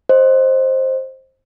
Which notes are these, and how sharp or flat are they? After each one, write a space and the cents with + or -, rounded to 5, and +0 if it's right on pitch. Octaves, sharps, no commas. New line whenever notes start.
C5 +10 D#5 +0